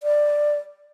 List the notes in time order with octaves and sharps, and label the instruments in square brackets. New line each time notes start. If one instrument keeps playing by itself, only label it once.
[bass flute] D5